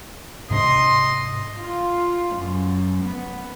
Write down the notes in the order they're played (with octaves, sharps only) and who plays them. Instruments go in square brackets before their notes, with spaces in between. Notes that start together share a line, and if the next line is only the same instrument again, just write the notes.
[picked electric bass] G#2 C3 D4 [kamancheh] D#5 C6
[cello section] F4
F#2
B3